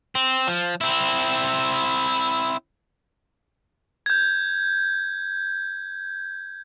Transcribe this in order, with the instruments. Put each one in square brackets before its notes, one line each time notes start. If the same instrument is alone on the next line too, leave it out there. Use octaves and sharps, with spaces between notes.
[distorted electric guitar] C4
F3
C4 E4
[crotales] G6 G#6